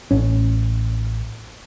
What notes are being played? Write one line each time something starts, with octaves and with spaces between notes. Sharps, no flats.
A1 C#4